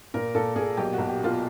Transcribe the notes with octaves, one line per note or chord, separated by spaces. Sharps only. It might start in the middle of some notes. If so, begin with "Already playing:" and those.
A#2 A#4
A#2 A4
A#2 G#4
B1 G4
F#4
B1
G4
B2 F4